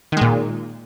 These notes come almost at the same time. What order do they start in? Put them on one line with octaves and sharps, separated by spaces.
D#3 G#3 A#2